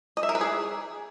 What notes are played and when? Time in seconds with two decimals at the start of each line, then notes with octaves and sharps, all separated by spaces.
0.17 D#5
0.23 E5
0.29 A#4
0.35 B4
0.41 G#4